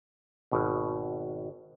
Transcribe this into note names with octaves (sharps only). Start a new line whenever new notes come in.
G#1 B2